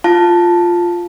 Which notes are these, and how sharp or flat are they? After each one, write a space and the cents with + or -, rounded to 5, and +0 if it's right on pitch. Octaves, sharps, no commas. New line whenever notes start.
F4 +0 F5 +0 A5 +0